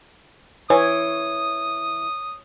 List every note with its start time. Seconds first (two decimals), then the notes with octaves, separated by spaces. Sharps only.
0.70 E3 C#5 D#6